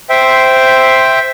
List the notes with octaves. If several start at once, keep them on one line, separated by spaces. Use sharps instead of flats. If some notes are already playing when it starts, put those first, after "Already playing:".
C5 E5 G5